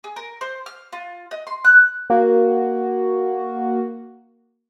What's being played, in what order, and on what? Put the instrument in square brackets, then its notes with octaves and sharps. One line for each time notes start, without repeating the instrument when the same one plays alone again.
[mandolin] G#4
A#4
C5
F6
F4
D#5
C6
F#6
[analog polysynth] A#3 F#4